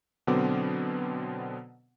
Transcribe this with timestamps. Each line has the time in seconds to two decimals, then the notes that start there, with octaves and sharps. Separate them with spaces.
0.27 B2 D3 F#3 B3 C4 D6